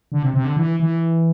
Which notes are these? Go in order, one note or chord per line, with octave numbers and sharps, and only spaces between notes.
D3
C3
C3
D3
E3
E3